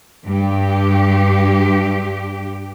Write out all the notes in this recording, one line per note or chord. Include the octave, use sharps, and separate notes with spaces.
G2 G4